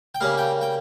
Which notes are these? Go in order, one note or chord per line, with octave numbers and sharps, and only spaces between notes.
G5
C#3 G3 A#3 F5
G5
G5